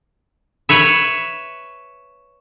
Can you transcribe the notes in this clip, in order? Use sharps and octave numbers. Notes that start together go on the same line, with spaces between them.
B4 C#5 E5